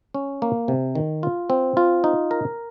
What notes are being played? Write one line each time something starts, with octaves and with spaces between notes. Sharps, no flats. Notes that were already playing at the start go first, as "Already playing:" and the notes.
C#4
A#3
C3
D#3
F4
C4
F4
D#4
A#4